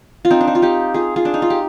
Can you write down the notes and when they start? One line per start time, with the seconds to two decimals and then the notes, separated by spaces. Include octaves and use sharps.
0.25 F4
0.31 C4 D#4
0.41 D4
0.47 D#4
0.55 F4
0.62 D#4 G4
0.94 F4 G#4
1.16 F4 G#4
1.25 D4
1.34 D#4
1.42 F4
1.50 G4